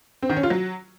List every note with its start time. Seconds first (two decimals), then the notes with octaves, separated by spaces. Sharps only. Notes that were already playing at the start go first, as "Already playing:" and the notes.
0.22 C4
0.29 D#3
0.36 C#4
0.43 F4
0.50 F#3